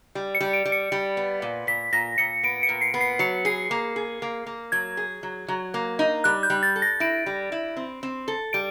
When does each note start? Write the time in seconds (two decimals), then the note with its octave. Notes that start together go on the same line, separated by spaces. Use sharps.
0.15 G3
0.35 C#7
0.41 G3
0.53 D7
0.65 G3
0.72 C#7
0.92 G3
1.17 B3
1.42 A#2
1.67 A#2 B6
1.93 A#2 A#6
2.18 A#2 C#7
2.43 B3 D7
2.63 C#7
2.69 A#2
2.81 C7
2.94 B3
3.01 C7
3.19 F#3 C#7
3.45 G#4 C7
3.71 A#3
3.96 G#4
4.22 A#3
4.47 A#3
4.72 F#3 G#6
4.97 G#4
5.23 F#3
5.48 F#3
5.74 A#3
5.99 D#4
6.24 G3 F#6
6.43 G6
6.50 G3
6.63 A6
6.76 A4
6.82 A#6
7.00 E4 D7
7.26 G3
7.52 E4
7.77 C4
8.03 C4
8.28 A4
8.53 G3 D7